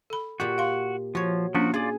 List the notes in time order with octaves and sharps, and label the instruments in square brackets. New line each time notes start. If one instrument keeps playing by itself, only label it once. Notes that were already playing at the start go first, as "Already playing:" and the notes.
[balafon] A4 B5
[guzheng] A#2 A#3 G4 [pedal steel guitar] F#4
[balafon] F5 C6
[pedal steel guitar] F3 [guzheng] F#4 C#5
[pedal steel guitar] F3 F#4 [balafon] A#3 C#4 D4
[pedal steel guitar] F4 D5 [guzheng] G#4